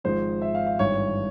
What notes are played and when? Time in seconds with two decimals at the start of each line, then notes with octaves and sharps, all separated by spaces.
0.04 G#1 G#2 F3 C5
0.42 E5
0.55 F5
0.66 F5
0.79 G#1 G2 E3 C#5